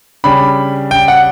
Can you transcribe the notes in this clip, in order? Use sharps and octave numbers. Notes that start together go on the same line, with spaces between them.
C#3 G3 D4 B5
G5
F#5